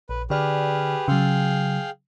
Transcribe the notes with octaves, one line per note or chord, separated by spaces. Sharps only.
A#1 B4
D3 G4 G#4 B4 D5 F6
C#3 F#3 G#4 F5 G5